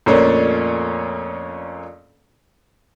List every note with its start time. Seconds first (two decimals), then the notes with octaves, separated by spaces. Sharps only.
0.06 F2 A#2 A3 A#3 C#4 D4